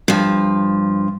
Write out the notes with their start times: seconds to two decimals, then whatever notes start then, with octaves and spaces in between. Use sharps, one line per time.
0.08 G2 F3